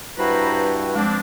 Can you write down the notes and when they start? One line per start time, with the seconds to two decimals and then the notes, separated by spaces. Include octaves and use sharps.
0.18 G2 E4 F#4 B4 C5 A#5 B5
0.95 F3 G#3 C4 D4